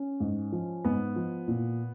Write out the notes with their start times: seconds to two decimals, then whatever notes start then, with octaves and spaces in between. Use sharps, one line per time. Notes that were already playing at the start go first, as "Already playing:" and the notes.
Already playing: C#4
0.20 G#2
0.52 F3
0.84 G#2 B3
1.16 F3
1.48 A#2